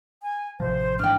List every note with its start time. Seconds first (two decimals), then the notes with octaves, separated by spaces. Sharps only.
0.23 G#5
0.60 A1 C3 F3 C5
0.99 G#2 E3 D4 G5 F6